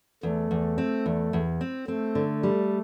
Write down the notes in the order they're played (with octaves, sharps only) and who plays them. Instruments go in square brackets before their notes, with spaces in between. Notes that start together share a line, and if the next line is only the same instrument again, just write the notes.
[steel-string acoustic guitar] E2 [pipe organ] A3
[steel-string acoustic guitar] E2
C4
E2
E2
C4
[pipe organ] A3 [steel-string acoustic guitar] C4
[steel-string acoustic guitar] D3
G3